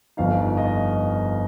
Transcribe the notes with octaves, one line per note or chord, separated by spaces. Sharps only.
G1 F2 F3 D#4 F5
D#5